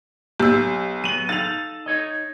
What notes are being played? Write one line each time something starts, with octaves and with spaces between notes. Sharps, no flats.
B1 G4 E6
F#3 B3 D#7 F#7
D#4 A4 F5 A6 F7
D#4 C#5 D#5